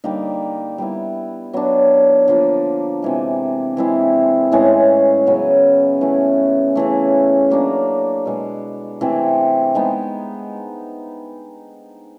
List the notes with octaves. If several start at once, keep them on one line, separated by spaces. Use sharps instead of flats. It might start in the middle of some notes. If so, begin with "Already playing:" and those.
D3 G3 A#3 D#4
G3 B3 E4
F#3 B3 D4
D3 F3 A#3
C3 E3 G#3
E3 G#3 C4 E4
A2 E3 G#3 C#4
C#3 F#3 B3
E3 A3 C#4 E4
C#3 E3 A3
F#3 A#3 D4
B2 G#3 B3
C3 E3 A3 C4
G#3 B3 D#4